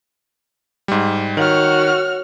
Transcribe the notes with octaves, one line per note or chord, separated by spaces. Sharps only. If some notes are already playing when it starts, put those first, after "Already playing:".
G#2 G3
D#3 F#4 C#5 F6